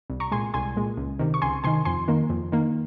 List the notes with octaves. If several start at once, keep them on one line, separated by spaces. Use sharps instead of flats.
C2
A#5 C#6
A#2 G#3 G#5 C6
C2 G#5 C6
A#2 G#3
C#2
C3 D#3
C#6
C#2 G#5 C6
C3 D#3 G#5 C6
F2 G#5 C6
D#3 A#3
F2
D#3 A#3